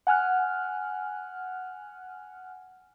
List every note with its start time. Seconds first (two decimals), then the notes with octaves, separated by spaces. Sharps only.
0.07 F#5 G#5 F6 F#6